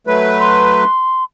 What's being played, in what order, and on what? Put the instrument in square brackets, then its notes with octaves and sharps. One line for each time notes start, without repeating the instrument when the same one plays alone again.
[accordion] F#3 A3 B4
[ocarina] C6